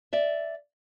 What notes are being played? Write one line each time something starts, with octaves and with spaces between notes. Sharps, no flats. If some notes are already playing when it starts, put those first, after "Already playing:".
D5 E5